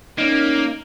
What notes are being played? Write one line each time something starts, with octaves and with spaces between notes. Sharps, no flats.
A#3 C#4 D#4